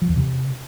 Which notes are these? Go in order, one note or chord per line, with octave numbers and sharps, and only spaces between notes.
F3
E2
C3